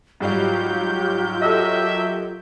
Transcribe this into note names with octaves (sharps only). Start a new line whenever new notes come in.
G#2 F#3 G3 F4 G4 F5 G6
A4 A#4 D#5 E5